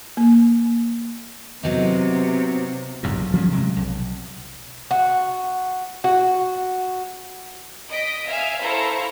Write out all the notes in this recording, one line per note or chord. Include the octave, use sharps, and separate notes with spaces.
A#3
C3 F#3 B3 D#4
F#1 B1 E2 G2
F3 G3 B3 C#4
C3 F#3 G#3
B1
F#4
F#4
D#5 B6 D7
E5 F5 G#5 F6
E4 A4 C5 F5 A#5 C#6